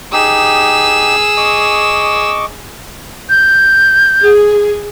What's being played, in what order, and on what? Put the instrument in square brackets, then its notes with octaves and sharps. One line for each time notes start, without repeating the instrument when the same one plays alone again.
[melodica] D#4 G4 [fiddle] G#4 E6
[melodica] D#5 C#6 D6
[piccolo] G6
[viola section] G#4